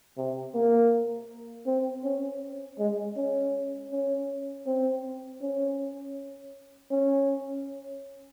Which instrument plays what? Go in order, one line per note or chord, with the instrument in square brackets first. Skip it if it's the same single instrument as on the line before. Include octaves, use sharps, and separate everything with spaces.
[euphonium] C3
A#3
C4
C#4
G#3
C#4
C#4
C4
C#4
C#4